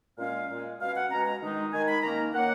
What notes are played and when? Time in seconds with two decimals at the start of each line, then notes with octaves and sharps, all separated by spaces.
0.18 A#2 G#3 C#4 F5
0.49 A#2 G#3 C#4
0.80 B2 G#3 C#4 F5
0.95 F#5
1.10 B2 G#3 C#4 A#5
1.26 A#5
1.42 D#3 G#3 D#4
1.72 D#3 G#3 D#4 G#5
1.88 B5
2.02 D#3 A#3 C#4 A#5
2.33 D#3 A#3 C#4 F#5